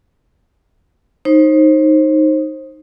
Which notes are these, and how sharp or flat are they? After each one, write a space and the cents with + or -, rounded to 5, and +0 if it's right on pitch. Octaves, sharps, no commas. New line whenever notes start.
D#4 +0 C5 +30